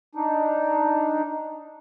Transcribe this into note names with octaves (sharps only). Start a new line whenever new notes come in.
D4 D#4